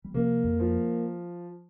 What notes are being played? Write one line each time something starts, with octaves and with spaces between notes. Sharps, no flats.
G3
C3 F3 A#3
F2
F3